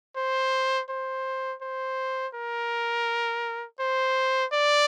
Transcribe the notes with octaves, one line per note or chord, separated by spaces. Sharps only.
C5
C5
C5
A#4
C5
D5